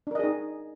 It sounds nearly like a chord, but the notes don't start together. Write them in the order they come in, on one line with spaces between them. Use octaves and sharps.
D4 A#4 D#5 G#4 D#4